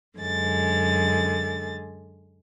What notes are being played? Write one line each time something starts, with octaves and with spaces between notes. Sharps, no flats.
F#2 D3 G#3 A6